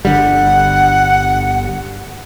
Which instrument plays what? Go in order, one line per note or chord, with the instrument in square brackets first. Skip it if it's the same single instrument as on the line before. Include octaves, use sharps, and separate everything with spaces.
[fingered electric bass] G1 D3 G3 [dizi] F#5